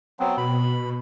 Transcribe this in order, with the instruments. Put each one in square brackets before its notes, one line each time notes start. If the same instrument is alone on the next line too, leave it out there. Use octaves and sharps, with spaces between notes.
[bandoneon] F#3 B3 C4
[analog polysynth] B2 [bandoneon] B5